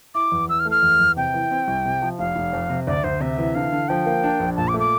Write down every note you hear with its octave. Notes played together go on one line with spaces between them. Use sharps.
E4 D6
E2
E3 E6
F6
A3
F6
E2
E2
C3 G5
E3
C4
C2
C3
F3
F1 F5
F1
F2
C3
D2 D5
D2 C5
C3 E5
E3
D3 F5
D3
F3 G5
A#3
D4
A#1
A#2 A5
D6
A3
D6